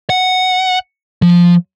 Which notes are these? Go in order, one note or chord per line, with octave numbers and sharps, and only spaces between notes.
F#5
F3